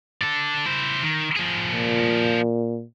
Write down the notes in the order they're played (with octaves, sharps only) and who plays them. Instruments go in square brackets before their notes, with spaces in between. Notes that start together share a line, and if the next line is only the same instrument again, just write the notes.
[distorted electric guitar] A4 D5
E4 C5
D#3
F3 G#4
[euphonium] A#2